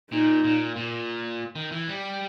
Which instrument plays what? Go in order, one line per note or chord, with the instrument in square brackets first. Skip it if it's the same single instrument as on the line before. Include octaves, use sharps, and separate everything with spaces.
[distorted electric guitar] A#2 [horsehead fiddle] D#4
[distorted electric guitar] A#2
A#2
D#3
E3
G3